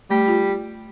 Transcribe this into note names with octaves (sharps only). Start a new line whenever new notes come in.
G3 A3
F4